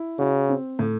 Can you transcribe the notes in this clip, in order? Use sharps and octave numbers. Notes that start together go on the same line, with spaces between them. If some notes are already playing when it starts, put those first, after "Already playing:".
Already playing: E4
C#3 F#4
C4
A2